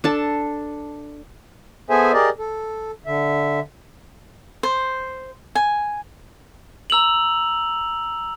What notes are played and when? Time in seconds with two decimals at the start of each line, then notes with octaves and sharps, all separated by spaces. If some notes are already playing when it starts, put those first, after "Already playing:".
0.04 D4 A4 A5
1.90 B3 G#4 A4 C5 E5 G#5
2.13 G4 G#4 A#4 D5 D#5
2.39 A4
3.06 D3 E5
4.63 C5
5.55 G#5
6.90 A#5 E6 F7 F#7